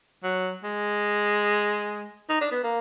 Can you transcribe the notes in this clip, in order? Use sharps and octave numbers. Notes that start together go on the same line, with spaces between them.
F#3
G#3
D#4
D4
B3
A#3